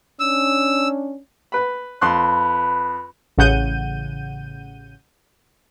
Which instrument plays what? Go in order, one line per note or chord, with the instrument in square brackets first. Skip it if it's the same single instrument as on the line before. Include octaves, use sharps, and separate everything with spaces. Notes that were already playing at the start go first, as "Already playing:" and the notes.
[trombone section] C#4 D4 [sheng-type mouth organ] E6
[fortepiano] B4 B5
[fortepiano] F2 C6 F#6 [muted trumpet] B4
[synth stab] A1 C#3 F#5 G6 D#7